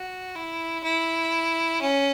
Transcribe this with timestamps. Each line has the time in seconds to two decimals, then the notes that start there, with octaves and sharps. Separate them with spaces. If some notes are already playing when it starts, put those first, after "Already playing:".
Already playing: F#4
0.35 E4
0.83 E4
1.81 C#4